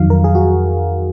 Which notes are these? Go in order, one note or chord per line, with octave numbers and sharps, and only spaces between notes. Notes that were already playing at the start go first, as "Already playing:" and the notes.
Already playing: F2 D#3 F#3 F5
A#4
G#4
F#4